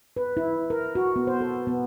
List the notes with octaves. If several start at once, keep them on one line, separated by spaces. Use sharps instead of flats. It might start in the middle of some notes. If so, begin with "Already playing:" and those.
B4
E4
A#4
F#4
B3
C5
A4
B3